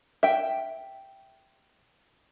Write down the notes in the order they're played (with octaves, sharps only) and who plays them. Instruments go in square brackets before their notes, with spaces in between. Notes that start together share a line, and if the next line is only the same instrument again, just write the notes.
[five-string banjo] E5 G5